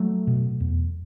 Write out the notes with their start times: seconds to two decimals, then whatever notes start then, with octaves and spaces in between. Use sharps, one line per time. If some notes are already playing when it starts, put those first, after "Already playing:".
Already playing: F#3 A3
0.27 B2
0.60 E2